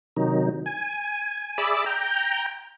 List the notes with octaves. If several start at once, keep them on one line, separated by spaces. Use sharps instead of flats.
C3 D#3 F#3 D#4
G#5
G#4 D5 E5 B5 D6 E6
G5 A#5 G6